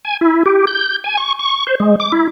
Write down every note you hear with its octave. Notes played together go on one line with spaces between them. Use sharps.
G#5
E4
G4
G6
G#5
C#6
C#6
C5
G#3
D6
E4